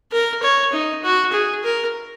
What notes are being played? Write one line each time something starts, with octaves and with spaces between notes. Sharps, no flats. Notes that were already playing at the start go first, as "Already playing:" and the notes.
A#4
C#5
D#4
F#4
G#4
A#4